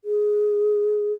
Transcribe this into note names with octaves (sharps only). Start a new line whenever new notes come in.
G#4